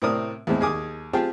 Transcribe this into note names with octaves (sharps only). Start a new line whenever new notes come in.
A2 C3 C4 A#4 D5 D#6
E2 A2 G#3 C4
D#2 G#4 G#5 D6 D#6
C4 F4 G4 G#4 G5 A5